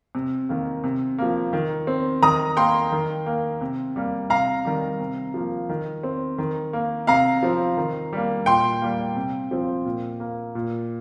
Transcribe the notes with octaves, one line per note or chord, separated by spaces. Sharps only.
C3
D#3 A#3
C3
F3 A#3
D#3
C4
D#3 A#5 D#6
A#3 G5 C6
D#3
A#3
C3
G3 A#3
C3 F5 A#5
D#3 G3
C3
F3 A#3
D#3
C4
D#3
A#3
C3 F5 A#5
F3 C4
D#3
G3 A#3
A#2 G5 C6
G3 A#3
C3
F3 C4
A#2
A#3
A#2